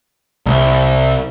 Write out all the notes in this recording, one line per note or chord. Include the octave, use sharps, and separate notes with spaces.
C2